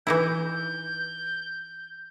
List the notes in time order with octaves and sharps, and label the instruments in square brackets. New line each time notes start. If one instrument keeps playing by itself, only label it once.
[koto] E3 D#4 E4 [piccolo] G6